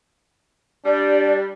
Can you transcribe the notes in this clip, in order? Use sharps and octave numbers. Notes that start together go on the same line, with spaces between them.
G3 D4 D5